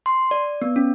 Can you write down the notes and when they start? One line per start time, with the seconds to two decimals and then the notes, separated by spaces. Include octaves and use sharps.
0.06 C6
0.31 D5
0.62 B3
0.76 C#4